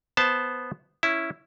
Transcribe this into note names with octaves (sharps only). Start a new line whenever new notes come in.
B3 C5 A5
C#4 E4